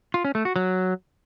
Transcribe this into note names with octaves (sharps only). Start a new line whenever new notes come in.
F4
C#4
A3
F#4
F#3